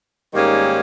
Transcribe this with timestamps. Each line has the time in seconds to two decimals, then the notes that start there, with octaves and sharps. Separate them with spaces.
0.33 G#2 D#3 G3 A#3 C#4